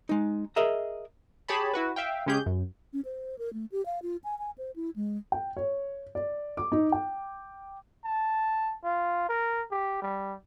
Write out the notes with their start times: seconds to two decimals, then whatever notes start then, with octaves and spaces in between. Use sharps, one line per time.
0.09 G#3 D#4
0.56 G#4 A#4 D#5 E5 A#5
1.48 G4 G#4 C#5 A5 B5
1.74 E4 F#4 B4
1.96 E5 F5 G5
2.26 C#3 G#3 C#4 G4 G#4 G6
2.46 F#2
2.93 C#4
3.05 C5
3.38 A#4
3.53 A3
3.72 G4
3.86 F5
4.02 F4
4.24 G#5
4.39 G#5
4.58 C5
4.76 E4
4.96 G#3
5.32 G5
5.57 C#5
6.15 D5
6.57 D6
6.72 D#4
6.92 G5
8.05 A5
8.84 F4
9.29 A#4
9.71 G4
10.02 G3